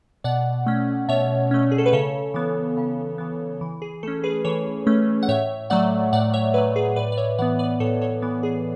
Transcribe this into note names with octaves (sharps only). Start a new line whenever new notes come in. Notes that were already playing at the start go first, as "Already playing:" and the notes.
B2 D5 F#5
A3 C#4
B2 C#5 E5
A3 C#4
G#4
A4
B4
C#3 A4 C#5
E3 B3
C#3
E3 B3
E3
G#4
A3 C#4 A4
G#4 B4
E3 A4 C#5
A3 C#4
F#5
A2 C#5 E5
F#3 A3 D5 F#5
A2 D5 F#5
C#5 E5
F#3 A3 B4 D5
G#4 B4
A2 B4 D5
D5
C#5 E5
E3 B3 D5 F#5
B4 D5
A2 A4 C#5
A4 C#5
E3 B3
G#4